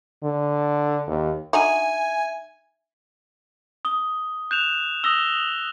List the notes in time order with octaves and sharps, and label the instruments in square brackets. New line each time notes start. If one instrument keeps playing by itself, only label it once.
[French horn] D3
D#2
[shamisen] D3 D#4 F#4 [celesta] E5 D#7 [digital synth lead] G#5
[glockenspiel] D#6 G7
[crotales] F#6 E7 F7 [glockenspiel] G6
[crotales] D#6 A#6 G7 [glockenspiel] E6